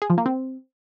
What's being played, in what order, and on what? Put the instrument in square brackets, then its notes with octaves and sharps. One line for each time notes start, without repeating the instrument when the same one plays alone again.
[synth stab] G#4
F3
A#3
C4